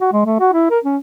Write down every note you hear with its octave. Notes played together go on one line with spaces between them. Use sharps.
F#4
G#3
A3
F#4
E4
A#4
C#4